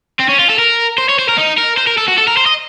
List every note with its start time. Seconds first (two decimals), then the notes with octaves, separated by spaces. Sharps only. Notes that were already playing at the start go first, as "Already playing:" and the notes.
0.20 C4
0.29 C#4
0.40 F4
0.50 A4
0.59 A#4
0.98 C5
1.09 C#5
1.19 C5
1.29 A#4
1.38 D#4
1.58 A#4
1.78 C5
1.87 A#4
1.98 A4
2.08 F#4
2.18 A4
2.28 A#4
2.37 C5
2.46 D#5